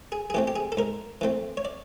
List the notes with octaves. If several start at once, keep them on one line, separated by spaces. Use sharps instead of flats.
G#4
G#4
E3 A3 C4 G4
G4
G#4
A4
G#2 A#4
E3 A3 C4
C#5
D5